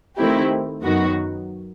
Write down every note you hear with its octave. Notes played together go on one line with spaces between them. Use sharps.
D#3 A3 C4 E4 G4
F#2 D#3 F#3 B3 F#4